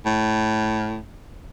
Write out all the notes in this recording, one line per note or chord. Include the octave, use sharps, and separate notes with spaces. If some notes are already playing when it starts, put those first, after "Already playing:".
A2